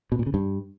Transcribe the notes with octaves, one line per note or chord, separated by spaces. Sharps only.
B2
A#2
C#3
G2